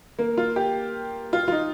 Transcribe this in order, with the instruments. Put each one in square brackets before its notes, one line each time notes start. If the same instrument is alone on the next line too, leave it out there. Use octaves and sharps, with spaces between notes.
[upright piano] A#3
F4
G4
F4
F4
D#4